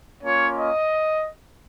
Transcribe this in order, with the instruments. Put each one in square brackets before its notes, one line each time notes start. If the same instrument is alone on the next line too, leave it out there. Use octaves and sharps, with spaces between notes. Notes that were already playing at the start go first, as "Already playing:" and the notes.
[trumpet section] A#3 C#4 F4 C#5
D#5